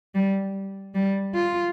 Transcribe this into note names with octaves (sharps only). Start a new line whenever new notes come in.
G3
G3
F4